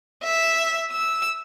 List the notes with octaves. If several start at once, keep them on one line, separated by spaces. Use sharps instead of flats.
E5
E6